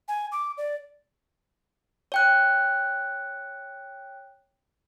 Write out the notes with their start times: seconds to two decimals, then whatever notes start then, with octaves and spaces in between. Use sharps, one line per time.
0.08 G#5
0.32 D6
0.58 D5
2.12 C#5 G5 F#6